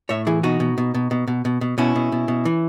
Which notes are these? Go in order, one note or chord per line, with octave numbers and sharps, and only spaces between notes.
A2 C#5 E5
E3 E4 G#4
B2 D#4 F#4
B2
B2
B2
B2
B2
B2
B2
B2 C#4 E4
B2
B2
B2
E3